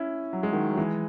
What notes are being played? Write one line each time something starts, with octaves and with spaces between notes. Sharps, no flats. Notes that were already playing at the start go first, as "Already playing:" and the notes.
Already playing: C#4 E4
F#3
G#3
D#3 F#3
F#3
E3 G#3